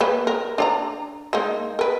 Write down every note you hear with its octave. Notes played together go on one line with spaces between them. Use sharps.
A#3 B4
A#4
D4 D5 A#5
G#3 A#3 D#4
A#4 B4